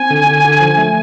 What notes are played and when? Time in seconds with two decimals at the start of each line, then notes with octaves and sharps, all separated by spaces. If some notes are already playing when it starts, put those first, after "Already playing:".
Already playing: C4 G#5
0.10 D3
0.27 D3
0.44 D3
0.61 F3
0.78 A3